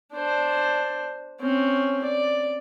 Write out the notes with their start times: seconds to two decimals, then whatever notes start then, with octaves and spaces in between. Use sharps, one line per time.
0.14 D4 C5
1.41 C4 C#4
2.04 D5